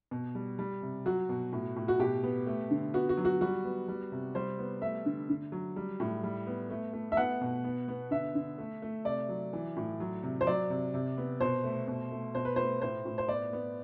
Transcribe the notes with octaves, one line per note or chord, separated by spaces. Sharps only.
B2
G3
G3
C3
F#3 F#4
B2
A2
A2
F#4
B2 G4
B3
A3
D3
B3 F#4
F#4
F#3
F#4
G3 F#4
B3
G3
C3
G3 C5
B3
A3 E5
D3
D3
F#3
G3
A2
G3
B3
A3
A3
E5
B3 F#5
B2
B3
B3
D3 E5
D3
A3
A3
C3 D5
F#3
E3
A2
F#3
C3
C5
F#3 D5
C3
C3
B3
B2 C5
A3
B2
A3
B2 C5
B4
A3 C5
A2 C5
A2
C5
B3 D5
B3